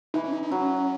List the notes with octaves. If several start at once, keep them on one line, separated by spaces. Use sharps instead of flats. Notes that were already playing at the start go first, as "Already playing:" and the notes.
E3 D#4
C#4
D#4
D#4
F#3 C#4